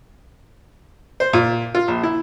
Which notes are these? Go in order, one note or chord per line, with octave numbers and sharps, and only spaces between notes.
C5
A#2
F4
A#1
E4